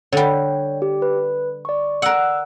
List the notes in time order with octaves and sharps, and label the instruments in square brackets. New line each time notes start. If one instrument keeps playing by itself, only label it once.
[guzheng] D3 G3 [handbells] C#5 G5
[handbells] G4
B4
D5 C#6
[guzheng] A#4 F#5 [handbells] D5 E6 F#6